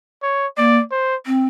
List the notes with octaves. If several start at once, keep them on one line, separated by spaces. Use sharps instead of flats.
C#5
A#3 D5
C5
C4